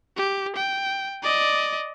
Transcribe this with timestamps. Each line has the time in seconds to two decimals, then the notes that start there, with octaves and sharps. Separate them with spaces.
0.17 G4
0.56 G5
1.23 D5 D#5